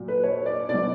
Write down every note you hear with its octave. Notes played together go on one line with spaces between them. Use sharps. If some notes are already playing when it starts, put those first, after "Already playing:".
Already playing: A#2 F#3
B4
C#5
D5
B2 F#3 D5